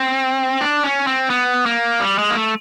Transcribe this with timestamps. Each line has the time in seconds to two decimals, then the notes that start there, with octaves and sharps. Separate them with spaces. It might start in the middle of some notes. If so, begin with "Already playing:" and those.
Already playing: C4
0.61 D4
0.84 C#4
1.07 C4
1.30 B3
1.66 A#3
2.00 G3
2.19 G#3
2.30 A#3
2.36 A3